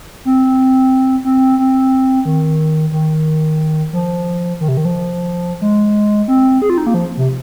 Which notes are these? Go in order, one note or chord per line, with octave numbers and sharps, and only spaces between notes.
C4
C4
C4
D#3
D#3
F3
D#3
C3
D#3
F3
G#3
C4
G#4
F4
D#4
A#3
F3
C3